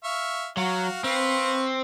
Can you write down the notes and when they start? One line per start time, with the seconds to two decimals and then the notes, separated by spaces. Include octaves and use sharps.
0.04 E5 F5 C#6
0.57 F#3 F#4 F5
1.04 C4 B4 F5 C#6